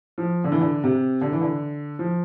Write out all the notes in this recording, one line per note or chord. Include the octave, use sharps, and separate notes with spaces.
F3
D3
E3
D3
C3
D3
E3
D3
F3